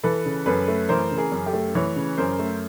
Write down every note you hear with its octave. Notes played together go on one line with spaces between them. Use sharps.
E3 A4 B4
C#3
F#2 A4 B4
A3
E3 A#4 C5
C#3
G#4 A#4
F#2
G4 A4
A3
E3 B4 C#5
C#3
F#2 A#4 C5
A3